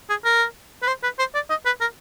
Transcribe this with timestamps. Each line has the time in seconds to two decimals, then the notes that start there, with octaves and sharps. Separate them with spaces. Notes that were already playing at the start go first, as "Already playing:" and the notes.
0.09 G#4
0.25 A#4
0.83 B4
0.87 C5
1.03 B4
1.19 C5
1.35 D5
1.50 D#5
1.66 B4
1.81 A#4